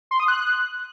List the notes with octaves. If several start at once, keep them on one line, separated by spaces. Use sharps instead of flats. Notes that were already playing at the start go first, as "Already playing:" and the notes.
C6
D#6
F#6